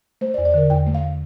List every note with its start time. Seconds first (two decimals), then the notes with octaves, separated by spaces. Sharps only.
0.21 A3 C5
0.34 D5
0.38 E2
0.45 D5
0.54 D3 A#4
0.70 E2 G5
0.87 A3
0.95 F5